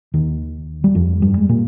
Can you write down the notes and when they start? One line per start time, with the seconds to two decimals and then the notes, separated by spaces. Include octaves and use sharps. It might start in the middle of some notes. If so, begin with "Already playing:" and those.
0.14 D#2 D#3
0.84 G3
0.95 F2 F3
1.22 G2 G3
1.38 G#3
1.49 A#2 A#3